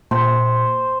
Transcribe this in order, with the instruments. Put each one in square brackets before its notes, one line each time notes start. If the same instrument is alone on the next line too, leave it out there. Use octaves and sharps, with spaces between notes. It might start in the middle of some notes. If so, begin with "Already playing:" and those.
[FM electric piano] A#2 [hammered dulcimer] C5